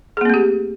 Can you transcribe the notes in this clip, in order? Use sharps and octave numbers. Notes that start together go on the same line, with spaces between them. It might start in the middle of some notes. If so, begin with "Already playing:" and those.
A3 A#3 C4 G4 G#4